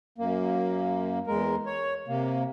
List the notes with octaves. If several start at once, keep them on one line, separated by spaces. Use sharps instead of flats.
F#2 A#3
E2 G#3 A#4
C#5
C3 A#3